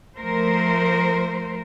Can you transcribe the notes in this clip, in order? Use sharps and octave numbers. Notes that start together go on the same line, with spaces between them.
F3 A3 A#4 C5